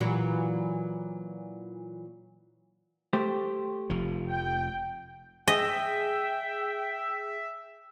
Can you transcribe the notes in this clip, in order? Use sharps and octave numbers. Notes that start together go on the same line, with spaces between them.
A#2 E3 F#3
A3 G4 C5
F1 F3
G5
G#4 D#5 E5 G5